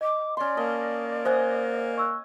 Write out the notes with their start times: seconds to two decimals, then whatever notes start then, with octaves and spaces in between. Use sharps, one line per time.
0.01 D#5 D6
0.37 C#4 D5 C6
0.57 A#3 D#5 A5
1.25 C5 D#5 F#5 G#5
1.98 C#6 E6 F#6